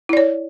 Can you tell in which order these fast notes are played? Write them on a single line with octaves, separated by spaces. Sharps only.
E4 D5 C#5